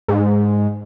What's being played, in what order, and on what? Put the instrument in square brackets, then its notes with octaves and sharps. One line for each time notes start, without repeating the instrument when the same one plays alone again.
[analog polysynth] G#2